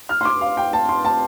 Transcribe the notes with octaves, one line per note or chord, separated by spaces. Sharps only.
F6
C6
D6
F5
G5
A5
C6
A5